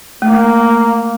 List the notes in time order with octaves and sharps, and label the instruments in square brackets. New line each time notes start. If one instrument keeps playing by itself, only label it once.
[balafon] A3 [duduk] A#3